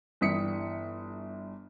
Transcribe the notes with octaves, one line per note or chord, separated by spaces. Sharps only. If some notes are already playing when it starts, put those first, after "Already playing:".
G1 E3 G3 D#6 B6 C#7